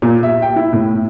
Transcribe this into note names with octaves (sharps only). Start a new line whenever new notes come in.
A#2
E5
G5
E4
A2